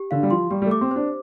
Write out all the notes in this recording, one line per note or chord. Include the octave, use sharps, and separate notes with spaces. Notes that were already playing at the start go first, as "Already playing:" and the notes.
Already playing: G4
D3 F5
G3
F3 C6
G3 G4
G3
A3
D6
C4
D4 C5